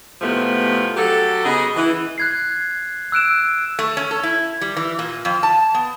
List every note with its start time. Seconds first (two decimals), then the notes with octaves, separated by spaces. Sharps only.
0.22 A2 C3 F3 G#3 A3 B3
0.97 F#3 F#4 G4 A4
1.45 C#3 B3 G#4 D#5
1.76 E3
2.18 F#6 G#6 C7
3.12 E6 F#6 D7 E7
3.79 A3
3.97 C#4
4.11 A4
4.23 E4
4.61 G3
4.77 E3
4.99 A#2
5.25 F2
5.43 A5
5.74 B3